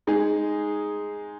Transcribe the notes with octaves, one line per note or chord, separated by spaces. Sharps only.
G#3 D#4 G#4